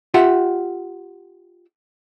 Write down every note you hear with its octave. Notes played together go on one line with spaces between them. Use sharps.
F4 G4 E5 F#5